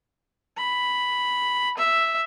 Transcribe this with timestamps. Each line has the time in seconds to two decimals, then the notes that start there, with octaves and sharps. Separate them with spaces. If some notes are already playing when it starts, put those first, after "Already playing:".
0.57 B5
1.77 E5